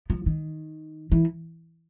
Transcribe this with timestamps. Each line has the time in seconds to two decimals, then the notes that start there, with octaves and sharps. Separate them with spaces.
0.10 F3
0.26 D#3
1.12 E3